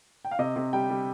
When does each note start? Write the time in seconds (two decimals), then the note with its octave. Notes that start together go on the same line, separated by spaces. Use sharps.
0.25 G5
0.31 F5
0.39 C3 D#5
0.56 C3
0.73 G3 G5
0.90 G3